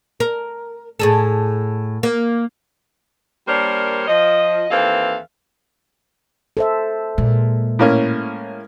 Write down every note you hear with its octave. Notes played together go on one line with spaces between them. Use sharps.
A#4
A2 G#4 A4
A#3
G3 A#3 D4 A#4 C5 C#5
F3 D#5
D#2 E3 C4 A4 F5
A4 C5 E5
A#2 G#3
A2 A#3 C#4